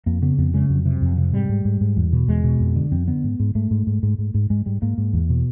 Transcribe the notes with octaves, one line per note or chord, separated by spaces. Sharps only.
F2 A#3
C#3 B3
F2 B3
C#3 G#3
F2 F#3
C3
F2
C3
G#2 G3
G#2
G#2
G#2
E2
B2
E2 G#3
B2
F2
D3
F2 C4
D3 B3
G#2
G#2
G#2 A3
G#2
G#2
G#2
G#2
G#2
G#2 G#3
G#2 G3
G#2 A#3
G#2
E2
B2